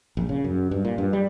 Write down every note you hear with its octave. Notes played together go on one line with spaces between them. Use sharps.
A#1
C#3
F#2
G2
A#2
G2
G3